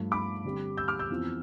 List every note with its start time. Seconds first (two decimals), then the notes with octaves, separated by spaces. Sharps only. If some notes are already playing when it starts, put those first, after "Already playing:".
Already playing: G2 F3 A3
0.12 B5 D6
0.45 D3 G3 C4
0.77 E6 G6
0.88 D6 F6
0.99 E6 G6
1.11 F2 E3 B3 F4